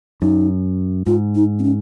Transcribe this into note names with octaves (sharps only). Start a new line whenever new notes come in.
F#2 D#4
G#2 F4
D#4
C4
C#4